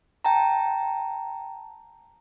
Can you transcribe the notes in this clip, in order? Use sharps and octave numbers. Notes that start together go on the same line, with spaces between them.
G5 A5 A#5